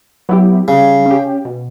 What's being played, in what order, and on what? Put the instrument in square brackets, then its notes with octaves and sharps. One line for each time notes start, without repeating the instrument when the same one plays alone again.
[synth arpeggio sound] F#3 B3 E4 G4
[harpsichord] C#3 [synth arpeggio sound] G3
[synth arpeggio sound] C#4 G4
B2